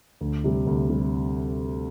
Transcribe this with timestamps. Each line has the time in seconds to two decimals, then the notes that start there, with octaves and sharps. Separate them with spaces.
0.21 D2
0.44 C3 G3
0.67 D2
0.90 C3 G3